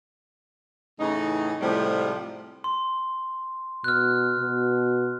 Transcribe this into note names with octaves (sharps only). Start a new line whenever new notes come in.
A2 C#3 E3 D#4
A2 C3 F3 G3 G#3
C6
B2 F6 F#6
B2